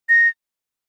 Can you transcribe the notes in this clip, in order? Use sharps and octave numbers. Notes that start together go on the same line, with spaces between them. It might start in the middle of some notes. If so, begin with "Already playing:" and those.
A#6